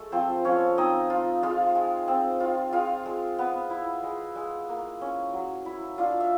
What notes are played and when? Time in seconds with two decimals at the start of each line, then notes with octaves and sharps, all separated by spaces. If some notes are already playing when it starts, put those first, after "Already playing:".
Already playing: G#3 A3 A4
0.12 F3 C4 C5
0.45 F3 C#4 C#5
0.78 C4 D#4 D#5
1.10 F4
1.43 G#3 F4 F5
1.75 G#3
2.08 C4
2.40 F4
2.72 G#3 F4 F5
3.06 G#3
3.39 B3
3.70 E4
4.03 G#3
4.35 G#3
4.69 A#3
5.01 C#4
5.33 F#3
5.65 E4
5.98 D4 F4 F5
6.20 E5